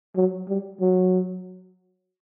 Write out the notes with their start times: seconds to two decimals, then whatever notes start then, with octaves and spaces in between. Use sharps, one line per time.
0.16 F#3
0.48 G3
0.81 F#3